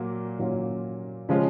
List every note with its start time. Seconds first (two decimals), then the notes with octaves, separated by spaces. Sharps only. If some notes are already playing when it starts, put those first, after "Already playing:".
Already playing: A#2 F#3 A#3
0.39 A#2 F#3 A#3 C#4 F4
1.29 C#3 F3 G#3 C#4 F4